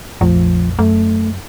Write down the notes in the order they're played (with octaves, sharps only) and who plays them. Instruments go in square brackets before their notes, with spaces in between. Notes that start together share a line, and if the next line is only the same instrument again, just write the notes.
[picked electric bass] A#1 F2 A3 [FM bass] F3
[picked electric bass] F#2 [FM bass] A3